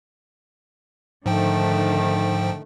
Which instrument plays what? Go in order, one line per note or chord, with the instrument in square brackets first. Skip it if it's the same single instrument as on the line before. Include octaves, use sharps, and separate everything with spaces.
[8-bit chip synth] G#2 F3 G5 [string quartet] D3 D#3 A3